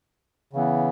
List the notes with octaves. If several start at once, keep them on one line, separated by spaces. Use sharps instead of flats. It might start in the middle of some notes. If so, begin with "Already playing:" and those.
C#3 E3 B3